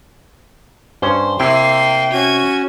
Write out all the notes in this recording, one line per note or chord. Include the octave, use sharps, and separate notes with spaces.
G2 C#4 C5
C3 A#3 E4 G5 C7
C#4 F#4 G#6 D#7